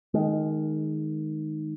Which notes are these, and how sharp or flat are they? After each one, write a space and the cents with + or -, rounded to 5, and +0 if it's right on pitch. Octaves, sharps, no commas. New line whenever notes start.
D#3 +0 G#3 +20